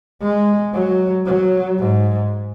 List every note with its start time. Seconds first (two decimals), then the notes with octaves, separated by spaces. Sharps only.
0.22 G#3
0.74 F#3
1.26 F#3
1.79 G#2